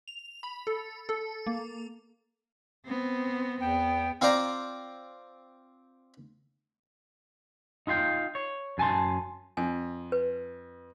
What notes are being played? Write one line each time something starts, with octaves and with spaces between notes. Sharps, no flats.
F7
B5
A4
A4
A#3
B3 C4
E2 B3 G5
C4 F4 C5 D5 A#5
D#4 F4 F5 G5
C#5
F#2 G#5 A5 C6
F2 G#5
B4